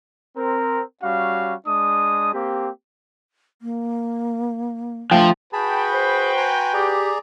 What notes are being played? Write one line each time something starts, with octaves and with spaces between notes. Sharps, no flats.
C4 A#4
G3 C#4 F#4 F5
G#3 D4 D#6
A#3 C4 G4
A#3
F3 A3 D4 F5 G5
F#4 G#4 B4 G5 A5 B5
C5
G#5 A#5 C6
G4 G#4 D5 A#5